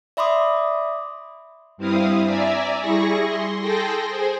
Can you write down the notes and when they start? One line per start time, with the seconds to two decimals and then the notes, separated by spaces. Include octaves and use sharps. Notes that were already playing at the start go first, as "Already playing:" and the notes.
0.17 D5 E5 B5 C6 D6 D#6
1.77 G2 C4 E4 F5 D#6
2.24 D5 E5 G#5 A#5
2.81 G3 E4 G#4 C#6 A#6
3.27 C6
3.60 G#4 A4 G5 C6 A#6
4.07 G#4 C5 G#5